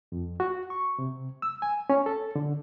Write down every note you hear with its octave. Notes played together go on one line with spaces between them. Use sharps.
F2
F#4
C#6
C3
E6
G#5
C#4
A4
D3